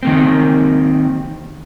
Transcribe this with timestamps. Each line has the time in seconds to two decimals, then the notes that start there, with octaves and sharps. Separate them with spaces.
0.03 D#3 A#3 C4